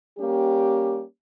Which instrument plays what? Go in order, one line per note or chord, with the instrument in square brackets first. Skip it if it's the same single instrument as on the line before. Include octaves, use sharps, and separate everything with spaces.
[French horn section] G3 A#3 C#4 G4